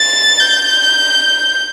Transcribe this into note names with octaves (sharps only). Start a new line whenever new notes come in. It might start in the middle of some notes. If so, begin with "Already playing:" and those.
Already playing: A6
G6